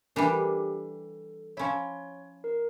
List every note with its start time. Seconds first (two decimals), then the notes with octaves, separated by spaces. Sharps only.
0.16 E3 G3 D4 A#4
0.25 A4
0.33 G4
0.41 A4
1.57 F3 C#4 E4 C#5
2.44 A#4